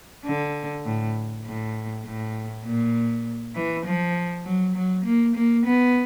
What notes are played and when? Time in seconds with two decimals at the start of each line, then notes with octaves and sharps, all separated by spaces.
0.25 D3
0.85 A2
1.45 A2
2.05 A2
2.65 A#2
3.55 E3
3.86 F3
4.45 F#3
4.75 F#3
5.05 A#3
5.35 A#3
5.66 B3